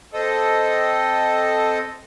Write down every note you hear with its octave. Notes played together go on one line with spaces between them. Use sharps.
C4 A4 D#5